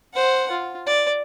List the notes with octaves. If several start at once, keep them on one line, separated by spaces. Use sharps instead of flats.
C5 F#5
F4
D5